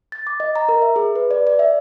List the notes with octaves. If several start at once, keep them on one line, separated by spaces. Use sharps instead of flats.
A6
D6
D#5
A#5
A#4
E5
G#4
B4
D5
D5
E5